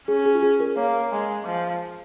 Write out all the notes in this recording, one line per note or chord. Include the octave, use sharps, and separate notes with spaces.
C#4 G#4
G#4
F4
G#4
A#4
A#3 C#5
G#3
F3